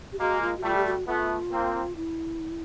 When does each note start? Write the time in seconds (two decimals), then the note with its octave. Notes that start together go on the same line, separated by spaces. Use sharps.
0.12 G4
0.19 G#3 A#3 F#4
0.42 F4
0.58 F#4
0.63 G3 A3 F4
0.76 G4
0.86 F#4
1.07 A3 B3 F4
1.51 A#3 C4
1.96 E4